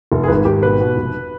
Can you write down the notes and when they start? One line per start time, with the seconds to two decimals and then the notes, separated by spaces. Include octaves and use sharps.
0.12 F1
0.23 G#4
0.28 G#1 B4
0.45 G#1 G4
0.62 B2 B4
0.80 B2
0.96 F1